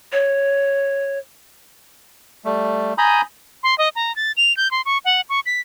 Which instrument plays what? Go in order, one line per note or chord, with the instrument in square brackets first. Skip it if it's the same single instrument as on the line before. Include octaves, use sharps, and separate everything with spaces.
[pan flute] C#5
[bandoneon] G3 A3
G#5 A#5 B5 D#6 G6
[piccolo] C6
D#5
A#5
A6
F7
G6
C6
C#6
F#5
C#6
B6